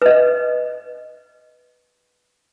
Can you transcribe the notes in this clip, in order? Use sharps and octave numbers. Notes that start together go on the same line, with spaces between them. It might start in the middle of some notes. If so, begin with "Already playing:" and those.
B4 D#5